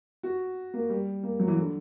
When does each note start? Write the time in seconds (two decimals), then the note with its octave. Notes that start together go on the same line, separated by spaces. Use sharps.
0.23 F#4
0.74 A#3
0.90 G3
1.23 A#3
1.40 F#3
1.48 E3
1.57 D3